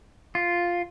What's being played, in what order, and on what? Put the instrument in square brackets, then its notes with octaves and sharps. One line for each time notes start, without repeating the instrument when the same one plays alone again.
[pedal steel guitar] F4